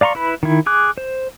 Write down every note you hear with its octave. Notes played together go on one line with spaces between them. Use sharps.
D5 F5 A#5 C6 C#6
E4 B4 B5
D#3 E4
G#4 D6 F#6
C5